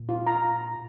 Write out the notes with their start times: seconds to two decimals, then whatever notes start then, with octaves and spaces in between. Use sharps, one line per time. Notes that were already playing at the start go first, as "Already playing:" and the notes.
Already playing: A#2
0.09 F4
0.27 A#5